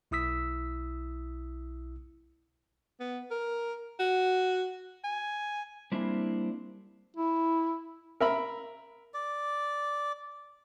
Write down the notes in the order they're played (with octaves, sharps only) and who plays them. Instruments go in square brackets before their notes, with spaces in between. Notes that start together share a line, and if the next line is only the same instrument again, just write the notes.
[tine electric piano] B1 E4 D#6 E6 B6
[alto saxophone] B3
A#4
F#4
G#5
[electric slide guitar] G3 A#3 C4 D4 E4
[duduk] E4
[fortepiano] A#4 E5 B5
[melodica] D5